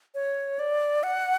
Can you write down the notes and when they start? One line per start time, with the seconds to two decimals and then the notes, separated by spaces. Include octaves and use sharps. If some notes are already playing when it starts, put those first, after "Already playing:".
0.15 C#5
0.59 D5
1.03 F#5